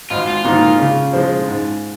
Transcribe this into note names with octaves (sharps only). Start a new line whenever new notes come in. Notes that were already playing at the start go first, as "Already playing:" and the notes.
G#1 F4
F4
G#2 D#3 A#3 D#4
C#3
F3 G#3
G#2